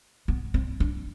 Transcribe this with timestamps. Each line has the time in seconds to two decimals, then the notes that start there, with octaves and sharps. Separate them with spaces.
0.28 B3
0.54 C4
0.80 D4